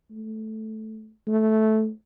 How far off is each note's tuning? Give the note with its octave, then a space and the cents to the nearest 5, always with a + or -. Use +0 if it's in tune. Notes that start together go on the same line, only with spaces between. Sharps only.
A3 -10
A3 -10